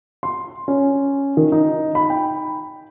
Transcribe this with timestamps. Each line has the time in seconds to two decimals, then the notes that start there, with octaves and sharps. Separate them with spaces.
0.23 C6
0.68 C#4
1.37 D#3
1.52 D#4
1.95 B5
2.10 G5